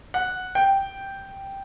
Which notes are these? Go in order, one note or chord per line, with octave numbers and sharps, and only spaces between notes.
F#5
G5